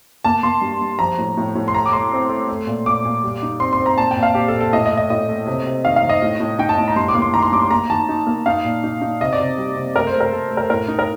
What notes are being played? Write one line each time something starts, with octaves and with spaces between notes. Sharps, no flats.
A#3 A5
A#3 C6
G2
G2
F3 A#5
A2
A2
A2
C6
A3 A#5
D6
A3 C6
C4
A3
A3
A#2
A#2 D6
A#2
G3
D#4
C4 C6
C6
C4
A#5
A#2 A5
G5
A#2
F5
A#2 G4
A4
A#2
A4
A2 D#5
D#5
A3
D#5
A2 D#5
A3
C3
C3
D#3 F5
F5
D#3
D#5
A2
A2
D#4 G5
A5
A2
A#5
G2 C6
D6
A#3
C6
D#3 A#5
C6
G2 D6
C6
A#3 A#5
D#3 A5
D#4
A#3
D#4 F5
A#2
D#4
D#4
C3 D#5
D5
C3
G3
C3
A3 A#4
C5
A3
A#4
A3 A4
A3
A#4
A2 A#4
D#4
A#4